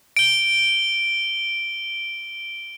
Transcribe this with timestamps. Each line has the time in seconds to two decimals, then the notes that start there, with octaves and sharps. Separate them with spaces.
0.17 D7 G7